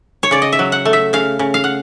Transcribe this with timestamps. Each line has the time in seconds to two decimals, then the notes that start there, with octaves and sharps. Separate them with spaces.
0.23 C#5
0.31 C#3 D5
0.42 D#5
0.53 E5
0.59 F#3
0.72 F#5
0.85 A3
0.93 E5
1.13 C#3 F5
1.39 C#3
1.54 F5
1.64 F#5